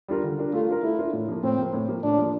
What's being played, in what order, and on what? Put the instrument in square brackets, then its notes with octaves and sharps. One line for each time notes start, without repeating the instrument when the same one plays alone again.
[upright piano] G3 D4 F4 A#4
D3
G3 D4 F4 A#4
[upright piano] A3 [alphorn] F4
[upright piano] D4 F4 A#4
[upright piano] A3 [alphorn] E4
[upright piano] D4 F4 A#4
A2
F3 A#3
[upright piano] A2 [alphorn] C4
[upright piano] F3 A#3
A2
F3 A#3
[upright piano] A2 [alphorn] D4
[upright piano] F3 A#3